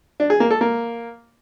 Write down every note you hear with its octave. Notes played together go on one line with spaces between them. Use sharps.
D4
G#4
A#3
A4
A#3